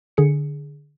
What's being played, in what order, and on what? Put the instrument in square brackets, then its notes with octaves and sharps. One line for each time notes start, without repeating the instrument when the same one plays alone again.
[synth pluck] D3 G#4 C#7